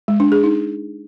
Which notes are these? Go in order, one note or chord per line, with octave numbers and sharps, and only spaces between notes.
G#3
D4
G#4
D#4